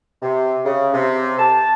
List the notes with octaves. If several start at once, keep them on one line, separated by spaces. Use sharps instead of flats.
C3
C#3
C3
A5